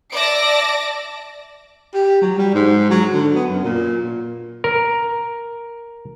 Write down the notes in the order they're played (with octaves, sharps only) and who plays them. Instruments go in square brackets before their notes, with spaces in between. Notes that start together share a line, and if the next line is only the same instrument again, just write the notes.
[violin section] D5 E5 A5 A#6 D7
[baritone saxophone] G4
F#3
G3
G#2
F#3
D3
B3
F#2
A#2
[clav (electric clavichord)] A#4